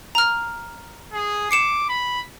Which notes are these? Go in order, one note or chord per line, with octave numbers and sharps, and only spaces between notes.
A#5 F6
G#4
D6 C7 C#7 E7
B5